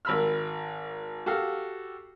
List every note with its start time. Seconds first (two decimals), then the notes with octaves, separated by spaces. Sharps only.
0.05 G#1 A#4 B5 E6 F6
1.26 F#4 G4 A4 F5